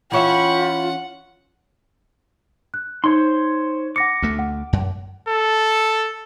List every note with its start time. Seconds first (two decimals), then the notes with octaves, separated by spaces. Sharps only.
0.12 E3 C#4 F4 E5 F#5 G5 B5 C#6
2.74 F#6
3.04 D#4 C5 C#5 C6
3.96 F#5 D6 A#6 C#7
4.22 D2 A3
4.39 F#5
4.73 F#2
5.29 A4